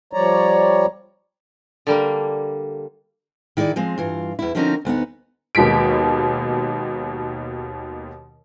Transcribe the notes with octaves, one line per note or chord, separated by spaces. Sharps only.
F3 G3 C#5 D5 A#5
D3 G3 A#3
D#3 E4 G#4 C#5 D5
F3 G#3 C4
G2 E3 F4
E2 E4
D3 F3 C4 C#4 D#4 A#4
D2 B3 D#4 F#5
D#2 B2 G#3 B6 D7